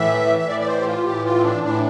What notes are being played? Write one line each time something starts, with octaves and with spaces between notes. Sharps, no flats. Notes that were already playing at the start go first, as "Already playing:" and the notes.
Already playing: A2 E3 E5
E5
A2 E3 D5
D5
C5
G4
F4
A2 E3 G4
F4
C4
D4
A2 E3 D4